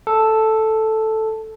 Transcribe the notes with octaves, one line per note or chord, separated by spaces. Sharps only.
A4